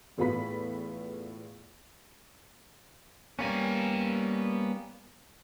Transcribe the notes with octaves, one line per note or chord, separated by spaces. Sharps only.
E2 A2 B3 F4 B5 B6
G3 A#3 B3 C#4 G#5